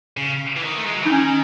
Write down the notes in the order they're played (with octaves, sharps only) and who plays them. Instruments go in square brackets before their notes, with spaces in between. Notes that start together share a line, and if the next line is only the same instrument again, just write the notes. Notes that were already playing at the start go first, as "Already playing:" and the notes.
[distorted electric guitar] C#3
E3
D#3
A3
G#3
F#3
[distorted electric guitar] E3 [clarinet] D#4
[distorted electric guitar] D#3 [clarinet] C#4